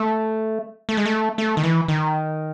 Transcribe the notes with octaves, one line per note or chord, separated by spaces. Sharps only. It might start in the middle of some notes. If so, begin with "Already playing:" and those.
Already playing: A3
A3
G#3
A3
A3
D#3
E3
D#3